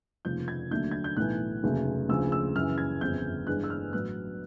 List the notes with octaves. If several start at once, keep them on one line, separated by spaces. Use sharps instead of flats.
F1 D#2 C#3 F3 G6
G#6
D#2 D3 F#3 A3 G6
G#6
G6
B1 A2 E3 A3 F#6
F1 D#2 C#3 F#3 A3
D2 C#3 F3 E6
E6
F#2 C#3 E3 F6
G#6
G1 F2 C#3 G6
G2 E3 G#3 F#6
E6
F6
A1 A2 F#3 B3 F#6